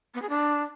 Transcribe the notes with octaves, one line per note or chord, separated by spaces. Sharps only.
B3
G#4
D4